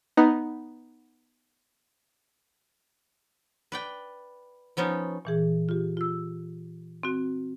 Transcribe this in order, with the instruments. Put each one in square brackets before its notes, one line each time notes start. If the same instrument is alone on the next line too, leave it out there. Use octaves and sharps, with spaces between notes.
[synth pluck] B3 D#4
[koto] B4 D5 G5
F3 B3 C#4 D#4
[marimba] A#2 E3 G#4
F4 G4
F4 E6
C4 F#4